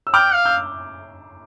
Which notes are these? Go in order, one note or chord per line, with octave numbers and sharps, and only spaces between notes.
E6
G5 D6 F6
F5
E6 G6